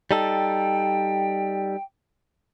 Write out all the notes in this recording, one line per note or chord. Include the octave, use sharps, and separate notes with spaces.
G3 D#4 A4 G5